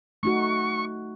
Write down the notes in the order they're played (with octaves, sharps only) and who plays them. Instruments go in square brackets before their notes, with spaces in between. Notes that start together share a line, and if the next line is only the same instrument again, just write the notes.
[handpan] A3 D#4 F#4 [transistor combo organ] C#6